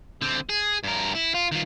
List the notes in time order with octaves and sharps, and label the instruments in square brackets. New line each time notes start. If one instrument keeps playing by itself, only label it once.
[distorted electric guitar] D3 C4
G#4
G2 A#4
E4
F4
D#3 F4